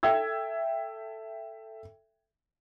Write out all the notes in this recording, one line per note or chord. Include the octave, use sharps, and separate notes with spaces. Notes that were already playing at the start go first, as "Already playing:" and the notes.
A4 E5 G5 E6 G#6